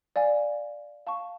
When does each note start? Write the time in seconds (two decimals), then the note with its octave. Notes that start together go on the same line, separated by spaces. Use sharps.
0.16 D5 F5 G#5
1.07 F5 A5 C#6